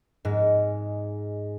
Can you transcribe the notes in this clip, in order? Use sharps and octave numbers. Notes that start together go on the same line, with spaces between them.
G#2 G#3